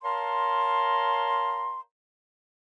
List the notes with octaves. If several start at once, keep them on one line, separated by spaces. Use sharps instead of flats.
A#4 C#5 F5 A5 A#5 C6